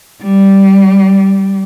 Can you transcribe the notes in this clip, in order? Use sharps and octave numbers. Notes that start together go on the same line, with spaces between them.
G3